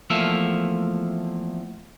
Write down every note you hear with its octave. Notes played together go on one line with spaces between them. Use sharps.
E2 F3 A3 A#3 E5 F5